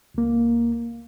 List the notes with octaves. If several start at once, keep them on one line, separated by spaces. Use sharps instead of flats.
C#2 A#3